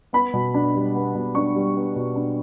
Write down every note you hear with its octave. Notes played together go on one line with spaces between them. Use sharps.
B3 B5
B2
D4
G3
B3
B2
D4 C#6
G3
B3
B2
D4